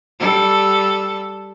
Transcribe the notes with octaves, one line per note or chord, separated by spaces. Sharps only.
G3 A4